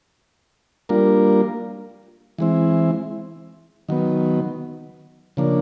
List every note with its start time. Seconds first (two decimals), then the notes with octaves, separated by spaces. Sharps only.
0.89 G3 A#3 D4 F4 A#4
2.38 E3 G#3 C4 E4
3.89 D#3 F#3 B3
5.37 C#3 F3 A#3 D4